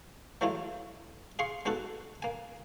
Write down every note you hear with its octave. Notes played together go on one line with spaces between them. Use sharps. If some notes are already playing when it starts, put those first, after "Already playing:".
E3 F#3 G#3 A3 E4 F4
G#4 F5 C6 C#6
G#3 B3 D#4 F#4 A4
A#3 G#5